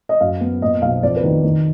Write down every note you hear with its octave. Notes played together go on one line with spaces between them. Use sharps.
D#5
F#2 F5
B3
A#2 D#5
B1 F5
F2 D5
B4
D#3
D#3